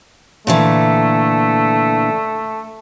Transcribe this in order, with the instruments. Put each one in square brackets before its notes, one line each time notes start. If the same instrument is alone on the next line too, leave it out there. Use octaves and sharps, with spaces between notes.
[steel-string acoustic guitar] A#2 D3 E3 [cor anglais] A3